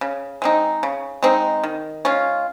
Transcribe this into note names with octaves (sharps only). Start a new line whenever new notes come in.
C#3
G#3 C4 D#4
C#3
G#3 C4 D#4
D#3
G#3 C#4 F4